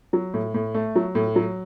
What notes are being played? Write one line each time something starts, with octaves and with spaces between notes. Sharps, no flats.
F#3
A2
A2
A3
F#3
A2
F#3